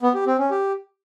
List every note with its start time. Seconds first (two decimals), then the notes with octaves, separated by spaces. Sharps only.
0.02 B3
0.14 G4
0.26 C4
0.38 C#4
0.50 G4